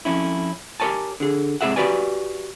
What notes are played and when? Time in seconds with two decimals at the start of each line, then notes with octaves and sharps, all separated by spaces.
0.05 F2 C#4 E4
0.80 G4 A#4 C#5 G#5 A5
1.20 D3 G#4
1.61 G#2 C3 G#4 E5 F#5
1.76 F#4 G4 A#4 B4 D5 G#5